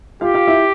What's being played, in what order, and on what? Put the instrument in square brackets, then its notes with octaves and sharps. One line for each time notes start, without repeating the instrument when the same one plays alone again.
[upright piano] F4 F5 [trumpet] G4
[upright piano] F4 F5
E4 E5